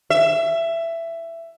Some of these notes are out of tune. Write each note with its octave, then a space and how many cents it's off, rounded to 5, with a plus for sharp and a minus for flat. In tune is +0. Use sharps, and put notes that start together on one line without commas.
E5 +15